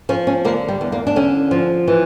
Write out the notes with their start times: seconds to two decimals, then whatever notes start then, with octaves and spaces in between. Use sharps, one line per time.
0.09 F3 C#4
0.27 C#4
0.45 D3 A#3
0.68 G3
0.81 E2
0.92 A#3
1.07 D4
1.16 D3 C#4
1.51 F3
1.87 E3